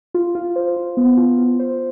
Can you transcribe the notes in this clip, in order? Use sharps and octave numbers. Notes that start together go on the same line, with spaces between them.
F4
F4
C5
F4
B3
F4
F4
C5